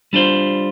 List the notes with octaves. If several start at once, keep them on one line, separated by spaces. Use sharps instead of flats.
G3 D4 F4 C5